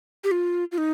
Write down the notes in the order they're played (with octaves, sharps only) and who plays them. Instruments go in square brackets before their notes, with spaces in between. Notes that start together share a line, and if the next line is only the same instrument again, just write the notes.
[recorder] G4
F4
F4
D#4